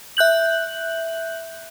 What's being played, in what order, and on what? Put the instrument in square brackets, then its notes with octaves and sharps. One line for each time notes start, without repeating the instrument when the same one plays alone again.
[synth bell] E5 F#6 G6 F#7